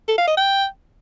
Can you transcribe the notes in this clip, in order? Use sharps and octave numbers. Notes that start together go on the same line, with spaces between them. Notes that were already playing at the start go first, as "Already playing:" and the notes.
A4
F5
D#5
G5